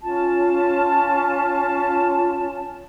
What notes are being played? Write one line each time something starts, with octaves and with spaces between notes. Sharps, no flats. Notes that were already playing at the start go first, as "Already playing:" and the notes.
C#4 F4 A5